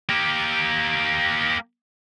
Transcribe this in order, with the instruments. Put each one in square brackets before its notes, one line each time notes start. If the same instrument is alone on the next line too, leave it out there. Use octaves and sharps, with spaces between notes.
[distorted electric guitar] A#3 G4